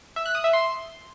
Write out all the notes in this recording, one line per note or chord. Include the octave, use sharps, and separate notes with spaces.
E5
F#6
D#6
E5
C6